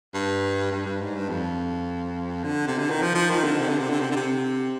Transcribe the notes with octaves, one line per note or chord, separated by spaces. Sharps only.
G2
G2
G2
G#2
G2
F2
D3
C3
D3
D#3
F3
F3
D#3
D3
C3
D3
C3
D3
C3
D3
C3